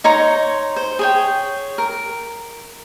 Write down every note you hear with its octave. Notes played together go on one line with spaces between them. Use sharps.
D#4 C#5 A#5 C6
C5
G#4 C#5 G5
A#4